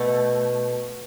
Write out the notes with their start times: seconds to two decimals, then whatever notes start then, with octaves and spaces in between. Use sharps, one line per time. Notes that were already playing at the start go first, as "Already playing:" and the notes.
Already playing: B2 A3